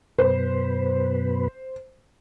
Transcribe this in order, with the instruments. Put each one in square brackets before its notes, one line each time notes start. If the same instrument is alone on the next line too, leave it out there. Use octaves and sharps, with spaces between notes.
[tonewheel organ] F#2 B2 B4 [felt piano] C5